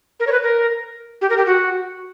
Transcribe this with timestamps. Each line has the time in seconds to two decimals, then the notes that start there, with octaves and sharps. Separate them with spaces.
0.20 A#4
0.27 C#5
0.32 B4
0.43 A#4
1.21 G4
1.30 A#4
1.37 G4
1.46 F#4